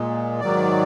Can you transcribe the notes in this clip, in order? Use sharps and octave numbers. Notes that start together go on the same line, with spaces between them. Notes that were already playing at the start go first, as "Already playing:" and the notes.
Already playing: A#2 G#3
G#2 D#3 F#3 D5